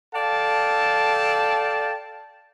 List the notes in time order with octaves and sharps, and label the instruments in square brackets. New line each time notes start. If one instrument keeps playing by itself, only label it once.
[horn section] A4 D5 F5 G5 A5